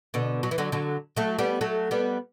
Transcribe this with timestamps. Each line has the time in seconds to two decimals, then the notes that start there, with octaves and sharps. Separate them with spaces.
0.14 B2 D3
0.43 F#3
0.51 E3
0.58 D3 F#3
0.72 D3 F#3
1.17 F#3 A3
1.39 G3 B3
1.61 F#3 A3
1.91 G3 B3